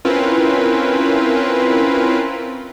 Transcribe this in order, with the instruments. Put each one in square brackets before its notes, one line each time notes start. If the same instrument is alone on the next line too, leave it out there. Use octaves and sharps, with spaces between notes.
[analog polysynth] C4 C#4 E4 F4 A#4 B4